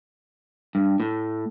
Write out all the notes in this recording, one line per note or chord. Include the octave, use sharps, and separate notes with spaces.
G2
A2